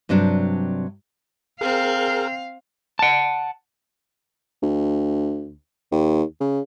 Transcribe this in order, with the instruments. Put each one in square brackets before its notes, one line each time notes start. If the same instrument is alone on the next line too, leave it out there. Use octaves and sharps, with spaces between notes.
[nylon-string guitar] G2 C3 F#3 D4
[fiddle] C4 [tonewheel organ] G#4 A#4 F6 [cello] F5
[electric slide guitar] F#5 A5
[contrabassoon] D2
D#2
C#3